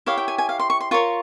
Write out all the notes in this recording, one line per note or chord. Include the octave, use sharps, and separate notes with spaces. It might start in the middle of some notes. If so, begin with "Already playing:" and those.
E4 G4 C#5 F5
G5
G#5
G#5
F5
C6
C#6
C6
F4 A#4 C#5 C#6